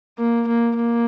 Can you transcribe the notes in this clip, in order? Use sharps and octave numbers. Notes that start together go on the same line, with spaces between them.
A#3
A#3
A#3